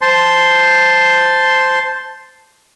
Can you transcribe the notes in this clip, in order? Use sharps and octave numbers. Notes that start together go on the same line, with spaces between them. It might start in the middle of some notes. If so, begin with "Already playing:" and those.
C5 A5 C6